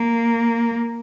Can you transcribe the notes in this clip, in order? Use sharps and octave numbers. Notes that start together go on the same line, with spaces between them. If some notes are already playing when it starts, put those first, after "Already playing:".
Already playing: A#3